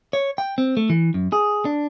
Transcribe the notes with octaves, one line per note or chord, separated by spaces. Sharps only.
C#5
G5
C4
A3
E3
F#2
G#4
D4